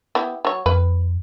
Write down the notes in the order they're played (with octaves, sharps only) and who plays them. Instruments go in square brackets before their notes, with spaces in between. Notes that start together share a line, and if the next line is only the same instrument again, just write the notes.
[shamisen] B3 E4 G4
F#3 C#5
[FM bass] F2 [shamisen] B4